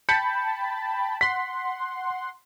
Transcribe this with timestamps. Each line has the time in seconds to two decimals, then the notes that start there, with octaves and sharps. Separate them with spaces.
0.09 G5 A5 B5 G6 C#7
1.21 F#5 C6 B6